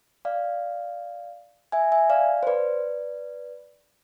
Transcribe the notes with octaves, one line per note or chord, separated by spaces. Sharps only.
D5 F5
E5 G#5
E5 G#5
D5 F5
C5
B4 D5